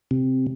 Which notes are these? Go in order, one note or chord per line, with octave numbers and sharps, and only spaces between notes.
C3